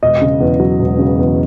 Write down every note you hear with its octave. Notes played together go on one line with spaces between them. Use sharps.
E1 D#5
C#3
E2
F#3
E1
C#3
E2